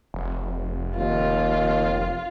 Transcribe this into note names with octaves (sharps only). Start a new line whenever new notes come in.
F1
D#2 F4